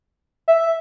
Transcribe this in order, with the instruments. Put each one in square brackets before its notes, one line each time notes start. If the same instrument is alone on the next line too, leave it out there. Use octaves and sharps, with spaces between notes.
[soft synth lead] E5